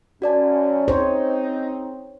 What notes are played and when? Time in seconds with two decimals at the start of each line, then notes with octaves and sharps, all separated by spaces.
0.22 F#2 C#4 F#4 D5 A5
0.88 C4 D#4 G#4 C5 C#5